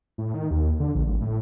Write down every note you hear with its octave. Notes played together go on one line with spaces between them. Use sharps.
A2
D#3
D#2
D3
A#1
G#1
A2